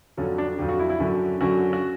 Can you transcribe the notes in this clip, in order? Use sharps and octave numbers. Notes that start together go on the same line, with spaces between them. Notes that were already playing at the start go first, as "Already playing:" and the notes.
F2 D3 F#3 C#4
D4
F2 D3 F#3 G4
F#4
E4
E4
F#2 D3 F#3
F#2 D3 F#3 F#4
F#4